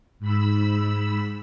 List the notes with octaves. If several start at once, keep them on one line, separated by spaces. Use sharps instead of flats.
G#2 B5 E6